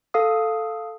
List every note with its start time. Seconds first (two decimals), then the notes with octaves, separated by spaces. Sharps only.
0.14 A4 F5 D#6